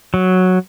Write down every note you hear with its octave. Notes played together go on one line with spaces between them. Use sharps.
F#3